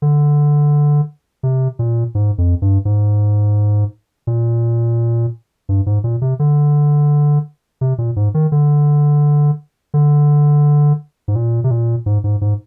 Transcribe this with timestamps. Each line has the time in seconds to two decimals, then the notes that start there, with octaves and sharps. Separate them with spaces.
0.02 D3
1.43 C3
1.79 A#2
2.15 G#2
2.38 F2
2.62 G2
2.85 G#2
4.27 A#2
5.69 G2
5.86 G#2
6.04 A#2
6.22 C3
6.39 D3
7.81 C3
7.98 A#2
8.16 G#2
8.34 D#3
8.52 D3
9.94 D3
11.28 G#2
11.36 A#2
11.64 C3
11.71 A#2
12.06 G#2
12.24 G#2
12.41 G#2